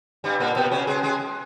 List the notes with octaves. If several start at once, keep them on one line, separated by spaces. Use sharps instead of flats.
G2 G3
A#2 A#3
B2 B3
C#3 C#4
G#3 G#4
G#3 G#4